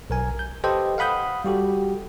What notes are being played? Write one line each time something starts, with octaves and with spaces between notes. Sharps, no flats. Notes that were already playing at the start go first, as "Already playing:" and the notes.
B1 A#4 G#5
G6
G4 A4 B4 C5 D#5 G5
F5 F#5 B5 D#6 G6
G3 F#4 G4 A4